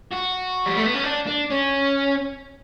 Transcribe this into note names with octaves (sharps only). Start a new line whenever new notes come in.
F#4
G3
A3
B3
C#4
D4
D4
C#4